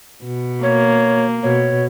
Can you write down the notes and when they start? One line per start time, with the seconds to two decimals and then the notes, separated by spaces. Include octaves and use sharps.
0.24 B2
0.63 A#3 C#5
1.43 B2 C#5